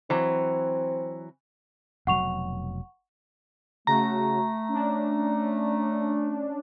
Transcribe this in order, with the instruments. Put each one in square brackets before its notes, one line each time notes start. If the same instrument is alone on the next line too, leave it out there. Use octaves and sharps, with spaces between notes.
[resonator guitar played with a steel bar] E3 F#3 [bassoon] C4
[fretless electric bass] F1 B2 F#3 [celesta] F#5 C#6 F7
[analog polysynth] C#3 F#4 [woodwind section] A3 [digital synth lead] A#5
[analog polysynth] C#4 D4